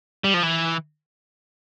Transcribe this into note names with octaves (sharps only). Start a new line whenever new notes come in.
G3
F3
E3